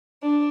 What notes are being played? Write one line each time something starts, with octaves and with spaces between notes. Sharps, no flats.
D4